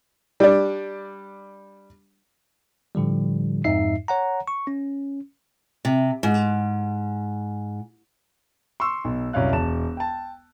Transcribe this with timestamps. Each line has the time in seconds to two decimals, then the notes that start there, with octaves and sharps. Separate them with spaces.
0.40 G3 D4
2.95 A2 D3 F3 G3
3.64 F2 G#2 D#4 E5 C7
4.08 C#5 F#5 A#5
4.48 C#6
4.67 C#4
5.85 C3
6.23 G#2
8.80 C6 C#6 E6
9.04 B1
9.33 C2 F#2 C#5 F5 F#6
9.52 E1 A5 E7
9.97 G5 A5